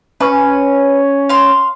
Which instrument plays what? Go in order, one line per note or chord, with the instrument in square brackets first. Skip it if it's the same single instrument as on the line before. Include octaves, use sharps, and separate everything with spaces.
[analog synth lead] C#4 [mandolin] B4
[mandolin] F5 C6